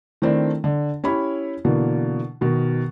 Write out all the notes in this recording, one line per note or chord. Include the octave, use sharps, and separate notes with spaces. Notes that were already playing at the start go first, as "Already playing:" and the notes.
D#3 A3 C4 D4 E4
D3
C#4 E4 G4 C#5 B5
B2 D3 E3 A#3
B2 D#3